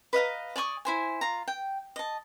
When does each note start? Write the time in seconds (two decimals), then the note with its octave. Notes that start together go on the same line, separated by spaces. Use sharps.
0.13 B4 D#5 F5 A#5
0.56 D5 G#5 C#6 D#6
0.85 E4 C5 G#5
1.21 F4 A#5
1.48 G5
1.96 D#5 A5